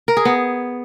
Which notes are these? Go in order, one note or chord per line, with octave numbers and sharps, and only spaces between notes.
A#4
G#4
B3